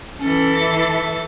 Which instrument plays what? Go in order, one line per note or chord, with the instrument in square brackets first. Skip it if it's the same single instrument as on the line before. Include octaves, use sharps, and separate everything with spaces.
[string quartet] E3 A4 [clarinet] C#4
[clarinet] E5